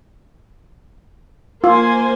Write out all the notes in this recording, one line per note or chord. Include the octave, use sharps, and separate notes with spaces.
A#3 F4 C5 G#5